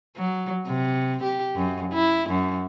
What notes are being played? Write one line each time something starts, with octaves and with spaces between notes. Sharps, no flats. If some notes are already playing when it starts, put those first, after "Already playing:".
F#3
C3
G4
F#2
E4
F#2